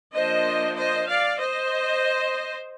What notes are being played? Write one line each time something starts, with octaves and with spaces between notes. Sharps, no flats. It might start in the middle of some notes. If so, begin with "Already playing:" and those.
F3 A#3 D4 C5 D#5
C5 D#5
D5 F5
C5 D#5